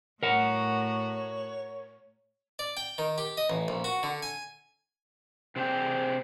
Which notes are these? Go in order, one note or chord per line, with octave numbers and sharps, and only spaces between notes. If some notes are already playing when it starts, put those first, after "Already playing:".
A2 F#4 A#4 C#5 F#5
D5
G5
D#3
G4
D#5
A1
A#1
F#4
D3
G#5
C3 C4 D4 G#4 C5 G5